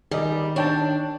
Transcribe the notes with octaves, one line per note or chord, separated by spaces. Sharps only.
D#3 G3 G#4 D5 D#5
D4 C#5 G5 A5